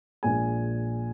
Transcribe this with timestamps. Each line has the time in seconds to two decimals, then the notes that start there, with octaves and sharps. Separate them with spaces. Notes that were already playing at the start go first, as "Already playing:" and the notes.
0.23 A#1 A#2 G#3 G#5